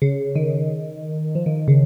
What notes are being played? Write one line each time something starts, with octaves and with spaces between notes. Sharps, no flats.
C#3
D#3
F3
D#3
D#3
C#3